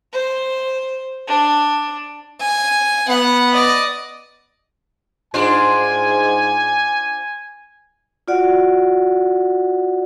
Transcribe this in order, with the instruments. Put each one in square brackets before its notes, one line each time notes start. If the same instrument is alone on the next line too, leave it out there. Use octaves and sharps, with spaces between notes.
[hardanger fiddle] C5
D4
G#5
[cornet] B3 [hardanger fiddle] F#5
[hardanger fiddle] D5 D#5
[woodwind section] G#2 [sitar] D4 F4 C5 [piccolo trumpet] G#5
[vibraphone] F4 F#4 D5 F#5